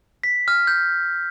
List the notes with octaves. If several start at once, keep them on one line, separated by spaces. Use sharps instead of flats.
B6
F6
G6